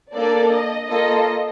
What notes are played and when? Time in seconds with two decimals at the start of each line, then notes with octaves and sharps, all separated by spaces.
0.13 A#3 D4 A4 D5
0.50 D#5
0.88 A#3 F4 A4 D#5